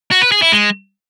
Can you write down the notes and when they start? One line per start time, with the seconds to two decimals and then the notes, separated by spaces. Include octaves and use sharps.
0.11 F#4
0.22 B4
0.32 G#4
0.42 E4
0.52 G#3